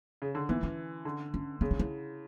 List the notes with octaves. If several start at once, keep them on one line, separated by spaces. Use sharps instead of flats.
C#3
D3
E3 B3
C#4
D3
C#4
C#3 B3
D4
E4